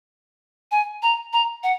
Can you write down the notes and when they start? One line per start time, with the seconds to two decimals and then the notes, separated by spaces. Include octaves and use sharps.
0.71 G#5
1.02 A#5
1.33 A#5
1.63 F#5